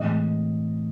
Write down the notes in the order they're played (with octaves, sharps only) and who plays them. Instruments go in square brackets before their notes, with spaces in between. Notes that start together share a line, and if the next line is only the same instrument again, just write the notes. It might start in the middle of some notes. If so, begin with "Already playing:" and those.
Already playing: [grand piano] A2 E3 G#3 C4 D#5